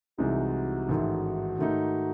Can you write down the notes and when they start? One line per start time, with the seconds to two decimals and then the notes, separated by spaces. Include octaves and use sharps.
0.18 C2 C3 E3 G#3 D#4 F#4
0.88 A1 G#2 D#3 A3
1.59 G#2 D#3 A3 D#4